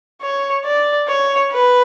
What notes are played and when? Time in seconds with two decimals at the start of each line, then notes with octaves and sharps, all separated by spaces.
0.22 C#5
0.65 D5
1.08 C#5
1.51 B4